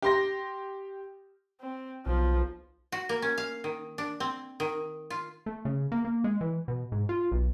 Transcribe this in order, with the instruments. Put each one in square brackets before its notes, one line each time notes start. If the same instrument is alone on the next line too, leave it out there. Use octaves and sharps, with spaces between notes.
[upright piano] G4 C6 A#6
[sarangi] C4
[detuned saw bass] B1 [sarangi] F3
[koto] F#4
A#3
C#4
F5
D#3
D4
C4
D#3
F4
[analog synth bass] A3
C#3
A#3
A#3
G#3
E3
B2
G#2
F4
B1